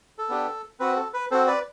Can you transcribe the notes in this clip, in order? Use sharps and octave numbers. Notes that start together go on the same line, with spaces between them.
A4
B3 D4 G4
C4 F#4 B4
A4
B4
C4 F#4 A4 C5
B4 D5